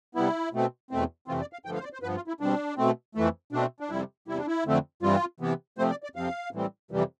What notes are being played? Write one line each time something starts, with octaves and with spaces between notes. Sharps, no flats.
C3 G3 B3 E4
B2 A3 C4
E2 B2 A3 C4
F2 C3 E3 A3 C4 F4
D5
F5
G2 D3 F3 A3 G5
F5
C5
D5
C5
G2 F3 B3 B4
F4
E4
B2 G3 C4 D4
B2 A3 C4
F2 E3 A3
B2 A3 C4 D4
D4
F2 C3 G3 E4
E2 C3 G3 E4
D4
E4
F2 D3 A3 C4
G2 E3 G3 C4 F4
C3 E3 B3
C3 F3 A3 C4 C5
D5
D5
F2 C3 F3 C4 F5
A2 E3 G3 C4
F2 C3 E3 G3